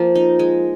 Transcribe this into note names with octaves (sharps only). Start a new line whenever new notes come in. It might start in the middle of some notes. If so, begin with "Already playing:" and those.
Already playing: F3 A#3
D#4
G#3